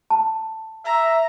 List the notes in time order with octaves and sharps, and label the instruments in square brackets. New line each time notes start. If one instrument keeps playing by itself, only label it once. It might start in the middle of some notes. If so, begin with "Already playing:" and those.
[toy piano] A5
[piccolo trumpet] E5 [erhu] A#5